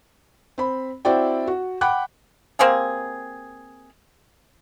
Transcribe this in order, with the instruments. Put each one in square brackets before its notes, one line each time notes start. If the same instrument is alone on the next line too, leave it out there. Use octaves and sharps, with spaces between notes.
[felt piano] C4 B5
C4 E4 F#4 D5 G5
F#4
F#5 G5 B5 D6 F#6
[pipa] A#3 C4 G4 G#4